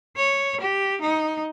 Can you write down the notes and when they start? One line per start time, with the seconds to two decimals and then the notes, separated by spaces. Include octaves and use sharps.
0.17 C#5
0.61 G4
1.01 D#4